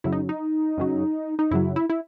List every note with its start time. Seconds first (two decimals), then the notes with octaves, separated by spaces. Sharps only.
0.04 F#2 C#3 F#3 E4
0.12 D#4
0.29 D#4
0.78 F#2 C#3 F#3
1.39 D#4
1.51 F#2 C#3 F#3 E4
1.76 E4
1.90 E4